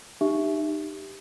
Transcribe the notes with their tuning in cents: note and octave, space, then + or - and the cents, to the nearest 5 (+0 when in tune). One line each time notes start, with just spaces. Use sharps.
D#4 -30 G4 +0 E5 +0